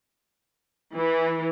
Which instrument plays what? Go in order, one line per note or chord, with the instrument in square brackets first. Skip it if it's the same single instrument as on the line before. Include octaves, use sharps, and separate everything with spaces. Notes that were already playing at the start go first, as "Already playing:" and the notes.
[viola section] E3